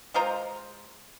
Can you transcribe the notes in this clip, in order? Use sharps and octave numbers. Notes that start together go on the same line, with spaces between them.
G#3 F4 C5 A#5